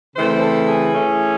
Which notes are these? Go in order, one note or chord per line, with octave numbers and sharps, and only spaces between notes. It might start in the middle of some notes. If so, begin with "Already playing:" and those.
C#3 E3 A3 C4 C5
A4
G#4
E3 A3 C#4